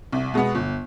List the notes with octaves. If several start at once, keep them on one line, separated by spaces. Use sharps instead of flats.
C2
B2 G#3 B3
G1